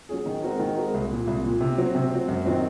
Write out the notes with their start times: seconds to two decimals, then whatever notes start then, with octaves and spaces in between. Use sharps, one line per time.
0.09 F#3 C#4 G#4
0.26 D#3
0.43 G#3 C4 F#4 A#4
0.59 D#3
0.76 G#3 C4 F#4 A#4
0.94 C2
1.11 A#2 F3
1.27 C2
1.44 A#2 F3
1.61 C3
1.78 F#3 C4
1.95 C3
2.11 F#3 C4
2.28 F#2
2.45 D#3 F#3 C4